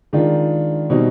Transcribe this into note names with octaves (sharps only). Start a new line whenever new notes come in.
D#3 G#3 D4 F4
B2 G3 C4 D#4